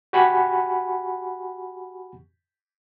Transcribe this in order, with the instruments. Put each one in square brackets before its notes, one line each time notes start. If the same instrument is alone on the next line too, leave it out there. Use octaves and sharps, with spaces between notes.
[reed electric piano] F#4 G4 F#5 G#5 B5 C#6